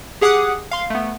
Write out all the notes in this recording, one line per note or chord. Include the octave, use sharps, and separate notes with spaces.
G4 G#4 F#5 D6 D#6 F#6
F5 C6
A3 B3